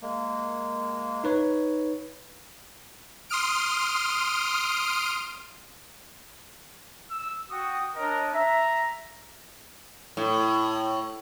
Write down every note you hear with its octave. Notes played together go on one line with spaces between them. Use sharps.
G#3 A#3
D#4 B4 C#5
C6 D#6 F6 D7
E6
F#4 G5 C#6 D#6
D4 A#4 C#5 D#5
E5 A#5
A2